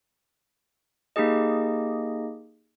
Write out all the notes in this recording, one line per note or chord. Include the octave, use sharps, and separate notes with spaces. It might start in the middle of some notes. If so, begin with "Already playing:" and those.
A#3 D#4 G4 G#4 D#5